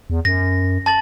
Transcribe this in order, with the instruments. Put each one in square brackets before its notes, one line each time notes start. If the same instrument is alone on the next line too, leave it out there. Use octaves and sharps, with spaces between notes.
[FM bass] E2
[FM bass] F#2 [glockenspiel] A#6
[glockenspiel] A5 A6 F#7